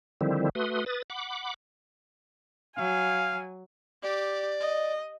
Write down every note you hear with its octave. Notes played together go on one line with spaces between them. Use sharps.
D3 D#3 F3 G3 C4 E4
A3 F#4 B4 C6 D#6
B4 D#6 A6
F#5 B5 D6
F#3 F5 G#5
G4 D5
D#5